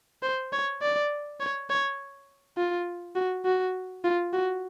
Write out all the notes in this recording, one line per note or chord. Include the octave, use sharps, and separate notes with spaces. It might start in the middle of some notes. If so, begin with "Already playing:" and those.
C5
C#5
D5
C#5
C#5
F4
F#4
F#4
F4
F#4